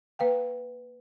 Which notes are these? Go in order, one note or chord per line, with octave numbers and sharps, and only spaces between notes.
A#3 B4 F5 G5